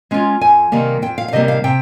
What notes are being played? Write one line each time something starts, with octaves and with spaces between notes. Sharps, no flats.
G#3 C#4 F4
F2 G#5
C3 D#3 G3 A#3
F2 G5
F5
F5
C3 D#3 G3 A#3 D#5
F5
C3 G5